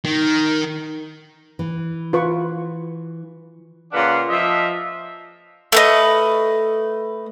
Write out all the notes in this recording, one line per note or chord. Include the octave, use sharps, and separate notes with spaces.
D#3
E3
F4 B4 C#6
A#2 C#3 D4 B4 F5 F#5
F3 D#5 E5
A3 B4 D#5